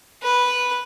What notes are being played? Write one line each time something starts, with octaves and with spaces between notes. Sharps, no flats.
B4